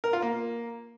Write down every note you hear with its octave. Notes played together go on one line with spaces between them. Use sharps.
A#4
F4
A#3